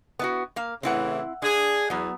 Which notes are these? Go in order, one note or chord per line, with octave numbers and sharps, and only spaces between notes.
B3 E4 F#4
A#3 F5
A2 C#3 E3 C4 E4 F#5
D4 G#4
E2 F#3 B3